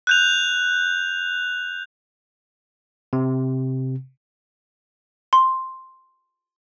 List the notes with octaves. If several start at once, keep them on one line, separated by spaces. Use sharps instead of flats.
F#6 G6 F7
C3
C6